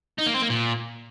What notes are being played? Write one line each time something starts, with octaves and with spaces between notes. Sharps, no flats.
D#4
A#3
C4
A#3
A#2